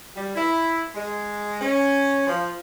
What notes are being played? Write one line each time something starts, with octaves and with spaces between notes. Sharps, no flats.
G3
E4
G#3
C#4
F3